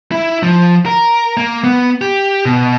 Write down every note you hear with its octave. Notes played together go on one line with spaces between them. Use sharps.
E4
F3
A#4
A#3
B3
G4
B2